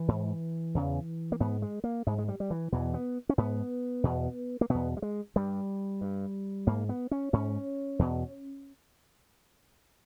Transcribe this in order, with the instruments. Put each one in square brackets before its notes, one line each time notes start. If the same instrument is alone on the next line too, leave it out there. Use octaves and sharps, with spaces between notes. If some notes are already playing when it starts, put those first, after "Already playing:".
Already playing: [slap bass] E3
G#2
E2 C#3
A#3
G#2 B3
G#3
A#3
G#2 G#3
G#3
G3
G3
E3
E2 B2 E3
B3
C#4
G#2 B3
E2 B2
A#3
E2 B2 B3
G3
G#3
G2 G3
G2
G#2 A#3
B3
C#4
G#2 C#4
E2 B2